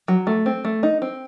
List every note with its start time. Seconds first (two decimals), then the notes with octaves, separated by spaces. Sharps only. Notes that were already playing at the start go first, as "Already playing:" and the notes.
0.08 F#3
0.27 A3
0.46 C4
0.65 A3
0.83 D#4
1.02 C4